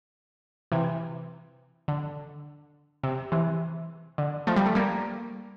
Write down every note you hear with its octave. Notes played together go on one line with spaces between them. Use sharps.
C3 E3
D3
C3
C3 E3
D3
F3 A3
G3
A3
G3 A#3